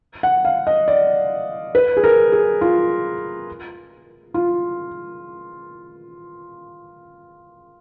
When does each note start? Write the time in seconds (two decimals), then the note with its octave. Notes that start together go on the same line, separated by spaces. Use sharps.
0.23 F#5
0.45 F5
0.67 D#5
0.88 D5
1.75 B4
1.97 G#4
2.04 A#4
2.32 G#4
2.61 F4
4.34 F4